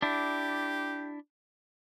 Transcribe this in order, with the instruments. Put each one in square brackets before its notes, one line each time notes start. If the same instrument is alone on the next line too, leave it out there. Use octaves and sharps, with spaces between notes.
[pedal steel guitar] D4 E4 [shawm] G4